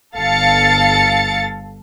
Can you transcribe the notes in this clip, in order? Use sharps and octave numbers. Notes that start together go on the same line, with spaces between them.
G1 A4 F5 A6 C#7